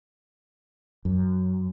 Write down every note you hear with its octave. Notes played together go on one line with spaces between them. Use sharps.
F#2